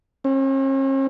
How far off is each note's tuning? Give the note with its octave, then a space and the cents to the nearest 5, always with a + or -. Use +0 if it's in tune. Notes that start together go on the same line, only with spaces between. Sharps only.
C#4 -45